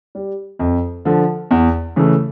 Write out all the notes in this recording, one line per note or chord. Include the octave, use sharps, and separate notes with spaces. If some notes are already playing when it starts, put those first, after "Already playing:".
G3
F2
D3 F3
E2
C#3 E3 A3